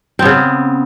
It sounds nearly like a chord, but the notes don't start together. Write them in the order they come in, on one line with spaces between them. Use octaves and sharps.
C4 B3 C#3